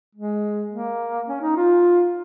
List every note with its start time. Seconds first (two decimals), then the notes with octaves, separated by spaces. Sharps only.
0.15 G#3
0.71 A#3
1.28 C#4
1.41 D#4
1.56 F4